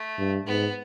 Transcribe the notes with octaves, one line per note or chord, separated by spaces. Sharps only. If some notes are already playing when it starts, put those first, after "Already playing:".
Already playing: A3
G2
G#2 B3